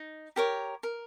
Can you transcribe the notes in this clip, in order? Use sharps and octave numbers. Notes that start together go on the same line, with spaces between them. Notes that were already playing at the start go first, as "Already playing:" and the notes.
Already playing: D#4
G4 A#4 C#5
A#4